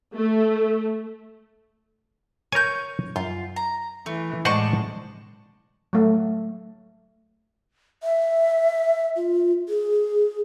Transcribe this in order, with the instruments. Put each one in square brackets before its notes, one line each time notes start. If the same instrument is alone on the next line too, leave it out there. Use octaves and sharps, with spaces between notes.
[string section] A3
[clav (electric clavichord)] A#4 G#5 [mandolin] C#5 G6
[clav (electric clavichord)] F#2 [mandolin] F4
[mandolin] A#5
[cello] E3 [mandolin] A3
[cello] A2 G#3 [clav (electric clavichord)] C5 D#5 F#5 [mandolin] D5 A5 C#6
[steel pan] F#3 A3
[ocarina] E5
F4
G#4